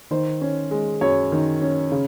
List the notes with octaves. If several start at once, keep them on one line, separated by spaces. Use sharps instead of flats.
D#3 C5
C#4
G#3
F#2 C#5
D#3
C#4
C#3